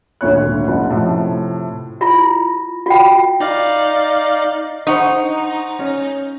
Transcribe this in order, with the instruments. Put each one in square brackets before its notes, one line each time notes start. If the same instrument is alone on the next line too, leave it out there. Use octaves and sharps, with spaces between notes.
[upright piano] G#1 D2 A#2 C#5 F#6
F#1 F#2 F#5
A2 C3 F3
[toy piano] E4 F4 B5
F4 F#4 G5
[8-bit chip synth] D#4 D5 F5
[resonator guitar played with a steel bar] D#4 [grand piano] C5 F#5 C#6
[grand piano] C#4